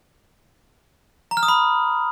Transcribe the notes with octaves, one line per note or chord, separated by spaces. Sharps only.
A#5
F6
D#6
B5